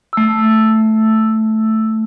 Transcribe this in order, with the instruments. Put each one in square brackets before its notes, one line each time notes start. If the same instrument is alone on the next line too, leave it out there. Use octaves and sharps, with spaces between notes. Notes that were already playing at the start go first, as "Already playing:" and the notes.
[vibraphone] A3 E6